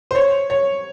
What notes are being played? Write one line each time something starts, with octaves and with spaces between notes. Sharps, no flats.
C5
C#5
C#5